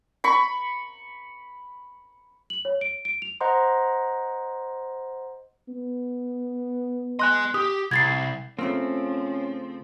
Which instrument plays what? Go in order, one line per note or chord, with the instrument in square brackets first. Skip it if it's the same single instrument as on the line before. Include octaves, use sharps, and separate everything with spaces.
[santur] B5 C#6
[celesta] F#7
C#5
D7
D7
F7
[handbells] C5 D#5 F#5 A#5 C6
[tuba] B3
[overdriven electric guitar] D#5 G#5 [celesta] C6 F#6
[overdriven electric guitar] G4 [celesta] D#6
[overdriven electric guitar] C2 [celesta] G#6 A6 C7
[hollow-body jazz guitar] C#3 A3 A#3 [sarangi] F3 [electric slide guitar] C4 [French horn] C#4